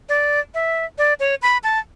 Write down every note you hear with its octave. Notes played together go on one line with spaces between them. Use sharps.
D5
E5
D5
C#5
B5
A5